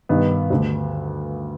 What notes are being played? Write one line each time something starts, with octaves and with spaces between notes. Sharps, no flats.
G2 D#3 B3
D2 D3